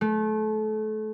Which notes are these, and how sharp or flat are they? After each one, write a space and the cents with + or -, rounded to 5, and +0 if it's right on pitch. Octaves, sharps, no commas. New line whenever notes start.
A3 -30